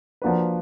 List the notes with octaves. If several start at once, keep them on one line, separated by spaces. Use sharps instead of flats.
F3 A#3 D4 F#4 B4